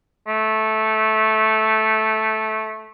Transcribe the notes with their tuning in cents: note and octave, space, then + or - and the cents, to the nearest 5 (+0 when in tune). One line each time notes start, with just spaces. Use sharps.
A3 -10